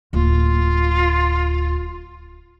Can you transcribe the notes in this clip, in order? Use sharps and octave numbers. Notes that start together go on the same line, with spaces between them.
D1 A#3 F4